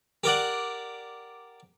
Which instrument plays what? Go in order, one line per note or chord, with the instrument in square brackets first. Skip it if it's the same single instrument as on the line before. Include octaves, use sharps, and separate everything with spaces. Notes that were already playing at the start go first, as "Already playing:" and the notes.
[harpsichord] G4 A#4 D5 F#5